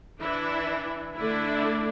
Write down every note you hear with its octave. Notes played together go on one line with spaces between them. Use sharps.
E3 D4 E4
D3 A3 D4 E4